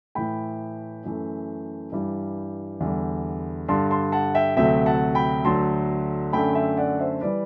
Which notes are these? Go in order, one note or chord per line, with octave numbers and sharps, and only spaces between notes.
A2 E3 A3 G5 B5
F#2 E3 A3
G2 E3 G3
E2 D3 G3
G2 D3 G3 A5 C6
A5 C6
F#5 A5
E5 G5
D2 C3 F#3 A3 E5 G5
F#5 A5
G5 B5
D2 D3 F#3 A3 A5 C6
F#2 D3 A3 G5 B5
E5 G5
D5 F#5
C5 E5
E3 G3 B4 D5